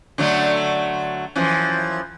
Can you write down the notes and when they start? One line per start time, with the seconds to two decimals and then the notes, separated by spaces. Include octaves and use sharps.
0.18 D3 F#3 A3
1.36 F#2 E3 F3